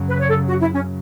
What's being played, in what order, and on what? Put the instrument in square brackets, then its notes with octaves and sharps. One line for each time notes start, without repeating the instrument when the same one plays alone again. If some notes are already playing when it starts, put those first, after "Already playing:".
Already playing: [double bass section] F#2 C#3 F#3
[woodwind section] B4
C#5
A4
F#4
E4
C#4